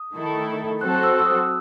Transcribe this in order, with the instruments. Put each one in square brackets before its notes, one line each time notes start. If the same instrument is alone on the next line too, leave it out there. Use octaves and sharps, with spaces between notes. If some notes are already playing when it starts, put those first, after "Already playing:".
Already playing: [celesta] D#6
[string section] D#3 A3 E4 A4
[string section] F#3 C4 F#4 A4 C5 [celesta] F#6
[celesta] F#6
E6
E6
D#6